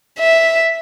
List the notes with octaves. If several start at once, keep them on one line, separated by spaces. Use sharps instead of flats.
E5